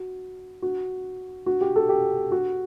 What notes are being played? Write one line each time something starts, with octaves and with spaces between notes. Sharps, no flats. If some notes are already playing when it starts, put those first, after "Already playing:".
Already playing: F#4
F#4
F#4
G4
A4
G4
F#4